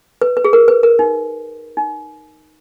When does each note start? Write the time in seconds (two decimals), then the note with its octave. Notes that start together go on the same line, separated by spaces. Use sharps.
0.22 B4
0.37 B4
0.44 G#4
0.53 A#4
0.68 B4
0.83 A#4
0.99 D#4
1.77 D#4